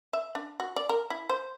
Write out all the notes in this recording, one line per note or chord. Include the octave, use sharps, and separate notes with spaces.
E5
D4
F#4
D5
A#4
E4
C5